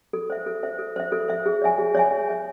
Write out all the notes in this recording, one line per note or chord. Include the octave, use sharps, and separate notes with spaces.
A4
C5 E5
A4
C5 E5
A4
C5 E5
A4
C5 E5
G#4
C#5 E5 G#5
G#4
C#5 E5 G#5
G#4
C#5 E5 G#5